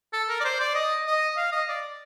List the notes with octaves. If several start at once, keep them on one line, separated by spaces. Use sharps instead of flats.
A4
A#4
D5
C5
D5
D#5
D#5
F5
D#5
D5